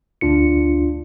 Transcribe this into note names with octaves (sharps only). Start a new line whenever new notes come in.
D2 D4 F4 C#7